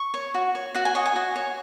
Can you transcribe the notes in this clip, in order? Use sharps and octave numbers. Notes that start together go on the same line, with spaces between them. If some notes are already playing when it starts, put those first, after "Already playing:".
Already playing: C#6
C#5
F#4
C#5
F#4 F#5
G#5
C#5 D#5
G#5
F#4
C#5